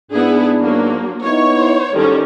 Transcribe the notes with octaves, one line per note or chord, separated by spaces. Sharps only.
G#2 B3 D4 E4 G#4
F#3 A#3
B3 D#4 E4 C#5
G#2 D#3 G3 C#4 A4